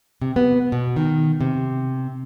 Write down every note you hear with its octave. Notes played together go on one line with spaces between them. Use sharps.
C3
B3
B2
D#3
C3